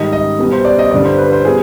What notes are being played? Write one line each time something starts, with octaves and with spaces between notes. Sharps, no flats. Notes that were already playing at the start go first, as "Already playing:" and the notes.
Already playing: G#2 D#3 G3 D#5
D#5
B2 G3
C5
D5
D#5
G2 D3 G3 D5
C5
B4
C5
B2 G3 G#4